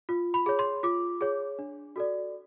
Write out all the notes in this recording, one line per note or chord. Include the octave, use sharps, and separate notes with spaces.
F4
B5
G#4 C#5
C6
F4 D6
G#4 C#5
D4
F#4 A4 D5